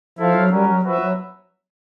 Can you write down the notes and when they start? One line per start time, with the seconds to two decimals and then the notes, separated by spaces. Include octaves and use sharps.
0.18 F3 E4 A4 C5 F5
0.35 F#3
0.51 G3 C#4 F#4 A#4
0.67 F#3
0.82 F3 F#4 B4 E5
0.99 F#3